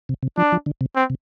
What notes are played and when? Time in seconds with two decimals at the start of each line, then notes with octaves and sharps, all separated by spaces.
0.09 C3
0.23 C3
0.37 F3 D4
0.52 F3
0.66 D3
0.81 C3
0.95 C4
1.10 C3